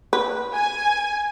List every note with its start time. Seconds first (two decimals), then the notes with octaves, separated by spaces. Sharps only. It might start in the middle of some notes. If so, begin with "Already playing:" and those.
0.13 B4
0.53 G#5